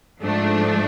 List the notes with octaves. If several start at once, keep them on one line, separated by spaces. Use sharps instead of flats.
G#2 F3 A3 D4